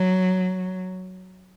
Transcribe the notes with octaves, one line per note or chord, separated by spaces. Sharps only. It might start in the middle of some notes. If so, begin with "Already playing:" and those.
Already playing: F#3